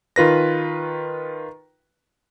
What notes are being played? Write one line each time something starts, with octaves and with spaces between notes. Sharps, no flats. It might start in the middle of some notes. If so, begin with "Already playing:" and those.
D#3 F4 B4 A#6